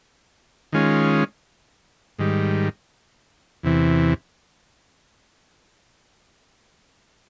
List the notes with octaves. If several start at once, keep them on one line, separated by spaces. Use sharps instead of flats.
D#3 G#3 C#4 F4
G#2 D#3 G3
E2 C3 E3